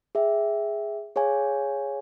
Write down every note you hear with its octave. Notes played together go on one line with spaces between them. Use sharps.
G#4 E5 G5
G#4 C#5 F5 G#5